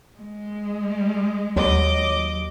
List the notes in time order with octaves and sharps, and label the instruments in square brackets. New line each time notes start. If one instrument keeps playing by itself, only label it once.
[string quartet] G#3
[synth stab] D#2 [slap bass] F#3 [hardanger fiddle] D#5 D6